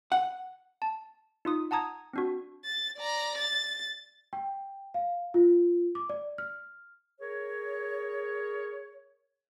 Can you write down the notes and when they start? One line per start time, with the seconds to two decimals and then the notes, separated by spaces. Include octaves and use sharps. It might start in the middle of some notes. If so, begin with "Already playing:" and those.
0.12 F#5
0.82 A5
1.45 D#4 F4 D#6
1.71 F#5 A5 A#5 D#6 G#6
2.13 C4 D4 F#4
2.65 A6
2.97 D5 A#5
3.38 A6
4.33 G5
4.94 F5
5.34 F4
5.95 D6
6.09 D5
6.38 F6
7.20 G#4 A#4 C#5